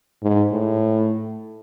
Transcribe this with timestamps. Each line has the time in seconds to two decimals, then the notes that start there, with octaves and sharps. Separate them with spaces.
0.23 G#2
0.52 A2